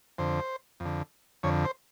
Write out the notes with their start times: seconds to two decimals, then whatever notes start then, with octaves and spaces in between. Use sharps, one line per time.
0.18 F2 D3 C5
0.80 F2
0.85 D3
1.43 F2 D3 C#5
1.65 C5